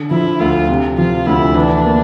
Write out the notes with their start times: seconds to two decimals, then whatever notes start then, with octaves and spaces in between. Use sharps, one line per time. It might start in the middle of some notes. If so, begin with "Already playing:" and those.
Already playing: D3
0.11 F3 E4
0.40 D2 F4
0.69 C3
0.97 F3 F4
1.26 D2 E4
1.56 E3 D4
1.84 A#3